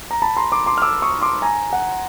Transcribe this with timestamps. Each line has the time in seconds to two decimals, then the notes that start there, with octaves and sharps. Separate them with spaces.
0.11 A#5
0.22 A5 B5
0.36 A#5 C6
0.52 C6 D6
0.66 C6 D6
0.78 F6
0.82 D6 E6
1.02 C#6 D#6
1.22 C6 D6
1.42 G#5 A#5
1.73 F#5